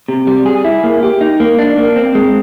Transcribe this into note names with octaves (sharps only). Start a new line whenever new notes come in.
C3
G3
G#4
E4
A#3
G4
D#4
A#3
D4
A#3
C4
G#3